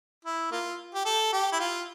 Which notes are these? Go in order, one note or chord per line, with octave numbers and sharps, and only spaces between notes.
E4
A#3 F4
G4
A4
G4
E4
F4